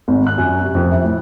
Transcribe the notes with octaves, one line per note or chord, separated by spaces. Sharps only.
G#1
F#6
F#2
C3
F2
E5
A2